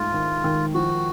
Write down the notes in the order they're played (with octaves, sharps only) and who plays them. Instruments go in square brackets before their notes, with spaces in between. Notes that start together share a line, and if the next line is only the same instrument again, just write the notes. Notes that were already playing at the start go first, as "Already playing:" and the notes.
Already playing: [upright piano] G#2 A3 [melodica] F4
[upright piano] D#3
D#3
[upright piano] F3 [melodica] F#4